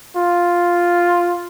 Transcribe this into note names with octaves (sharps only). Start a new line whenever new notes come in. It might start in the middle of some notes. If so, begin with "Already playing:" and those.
F4